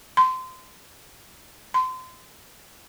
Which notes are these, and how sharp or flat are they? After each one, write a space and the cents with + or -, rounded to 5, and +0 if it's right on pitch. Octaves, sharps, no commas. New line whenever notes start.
C6 -25
C6 -30